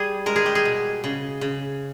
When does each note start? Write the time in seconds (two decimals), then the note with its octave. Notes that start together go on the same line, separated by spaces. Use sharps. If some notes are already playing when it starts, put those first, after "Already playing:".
Already playing: G3 G#4
0.26 G#3 A#4
0.36 G#4
0.46 G4
0.55 G#4
0.65 B2
1.04 C#3
1.41 C#3